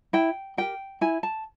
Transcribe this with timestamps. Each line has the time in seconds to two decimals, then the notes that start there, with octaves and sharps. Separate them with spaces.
0.13 E4 G5
0.57 G4 A#4 G5
1.01 E4 G#5
1.23 A5